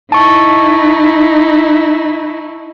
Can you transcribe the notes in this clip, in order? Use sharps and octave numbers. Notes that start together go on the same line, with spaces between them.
D#4 E4 A5 C#6